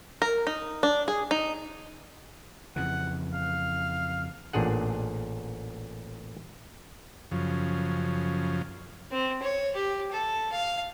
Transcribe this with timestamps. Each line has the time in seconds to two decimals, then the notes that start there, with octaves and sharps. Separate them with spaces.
0.22 A#4
0.47 D#4
0.83 D4
1.08 G#4
1.31 D#4
2.76 F2 C#3 E3 F#5
3.33 F5
4.53 A1 A#2 D4 G#4 F#5
7.31 F#2 C#3 F3
9.12 C4
9.42 C#5
9.75 G4
10.12 A4
10.53 F5